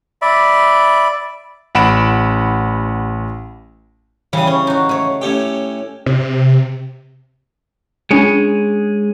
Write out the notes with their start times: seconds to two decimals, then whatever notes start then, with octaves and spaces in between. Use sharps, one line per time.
0.22 D5 E5 B5
1.75 A1 F#5 B5 D7 E7
4.33 C#3 E3 G3 D#6
4.47 C#4
4.67 D#4 F#4
4.89 A3 C#5
5.22 A2 C#4 G4
6.06 C3
8.11 G#3 C#4 D4 F4 G#4 C#5